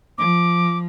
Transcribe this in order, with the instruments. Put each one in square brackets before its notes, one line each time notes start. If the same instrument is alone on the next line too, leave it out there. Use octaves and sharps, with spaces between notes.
[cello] F3 [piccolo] D6